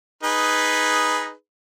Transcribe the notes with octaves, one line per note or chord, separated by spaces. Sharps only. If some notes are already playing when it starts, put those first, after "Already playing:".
D#4 G#4 B4